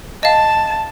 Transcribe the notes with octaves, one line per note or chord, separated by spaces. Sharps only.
D#5 F5 A5